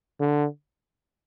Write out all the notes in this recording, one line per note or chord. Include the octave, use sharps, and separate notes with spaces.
D3